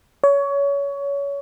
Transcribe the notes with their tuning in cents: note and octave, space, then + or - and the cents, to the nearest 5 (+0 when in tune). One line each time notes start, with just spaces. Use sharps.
C#5 +25